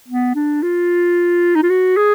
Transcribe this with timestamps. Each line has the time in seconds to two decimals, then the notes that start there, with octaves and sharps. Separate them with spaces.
0.08 B3
0.35 D4
0.62 F4
1.55 D#4
1.63 F4
1.70 F#4
1.97 G#4